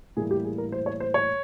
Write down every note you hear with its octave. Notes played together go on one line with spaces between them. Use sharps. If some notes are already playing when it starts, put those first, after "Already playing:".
A2 E3 G3 A#3 G#4
G4
G#4
A#4
C5
C#5
C5
C#5